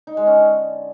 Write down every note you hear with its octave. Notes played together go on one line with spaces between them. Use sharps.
D#4
G#3
C#4
D3